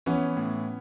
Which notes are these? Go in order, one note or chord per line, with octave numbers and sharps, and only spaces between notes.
E3 B3 C#4
A2